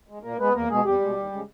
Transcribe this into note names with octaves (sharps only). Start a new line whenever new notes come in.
G#3
A#2 A#3 A#4
G#3 B3 B4
E2 A#3 A#4
B2 G#3 G#4
E2 G3 G4
B2 G#3
D#2
C#3 G#3